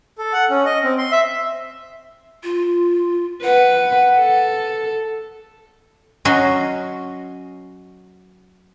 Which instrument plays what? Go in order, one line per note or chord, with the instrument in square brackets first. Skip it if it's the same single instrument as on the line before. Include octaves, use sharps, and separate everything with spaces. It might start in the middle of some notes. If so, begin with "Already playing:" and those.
[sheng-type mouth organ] A4
F#5
C#4
D#5
C4
C6
E5
[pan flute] F4
[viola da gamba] B4 [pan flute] F#5
[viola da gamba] A4
[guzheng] F#3 C#4 F#4 D#5 C6